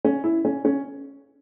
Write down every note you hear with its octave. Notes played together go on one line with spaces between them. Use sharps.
C#4
E4
C#4
C#4